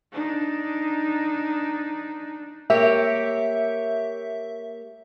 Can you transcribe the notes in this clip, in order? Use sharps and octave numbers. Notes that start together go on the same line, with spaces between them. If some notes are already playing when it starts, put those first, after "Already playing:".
D4 D#4
A#3 G4 C#5 E5